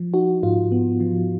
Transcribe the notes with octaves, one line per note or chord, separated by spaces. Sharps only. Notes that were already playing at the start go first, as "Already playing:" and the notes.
Already playing: F3
D#4 F#4
G#2 F4
B3
F3